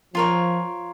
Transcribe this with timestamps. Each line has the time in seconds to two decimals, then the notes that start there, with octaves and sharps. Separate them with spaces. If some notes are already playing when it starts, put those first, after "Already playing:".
0.14 F3 F4 A#4 C#5